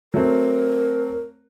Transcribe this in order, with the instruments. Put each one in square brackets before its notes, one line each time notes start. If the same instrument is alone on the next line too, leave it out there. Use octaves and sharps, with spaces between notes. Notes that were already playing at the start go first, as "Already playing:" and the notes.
[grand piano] F#3 A3 C4 [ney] A#4